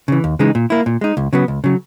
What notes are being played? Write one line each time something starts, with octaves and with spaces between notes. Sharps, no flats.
C#3 E3
D#2
C#3 E3 G#3 D#4
A#2
A#3 E4
A#2
G#3 D#4
C#2
C#3 F#3 B3
C#2
C#3 F#3